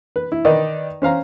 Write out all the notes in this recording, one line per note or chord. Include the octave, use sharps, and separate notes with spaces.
B4
E4
D#3 D#4 B4 D5 D#5
C#4 C5 F5 A#5